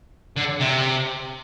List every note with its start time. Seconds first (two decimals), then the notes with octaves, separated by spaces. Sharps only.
0.37 D3
0.60 C3